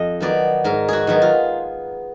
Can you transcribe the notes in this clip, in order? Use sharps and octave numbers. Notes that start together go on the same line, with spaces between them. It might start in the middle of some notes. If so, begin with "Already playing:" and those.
Already playing: F2 D#5
D#3 F#3 B3 D5
G#2 A#4
F#4 G#4
D#3 F#3 B3
F4